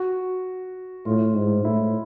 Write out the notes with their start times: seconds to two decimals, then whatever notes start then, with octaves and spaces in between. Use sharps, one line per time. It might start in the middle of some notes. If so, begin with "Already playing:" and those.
Already playing: F#4
1.06 A2 F4
1.35 G#2
1.65 A2 E4